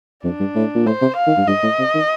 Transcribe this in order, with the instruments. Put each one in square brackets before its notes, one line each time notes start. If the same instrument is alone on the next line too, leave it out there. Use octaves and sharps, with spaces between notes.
[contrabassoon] F2 [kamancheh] D4
[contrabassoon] G2
A2
A#2
[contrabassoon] A2 [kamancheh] C5
[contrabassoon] C3
[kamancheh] F5
[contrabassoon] D#3
G2
[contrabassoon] G2 [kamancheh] D#5
[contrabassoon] A2
C3
D#3